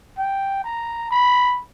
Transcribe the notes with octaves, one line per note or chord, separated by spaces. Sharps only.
G5
A#5
B5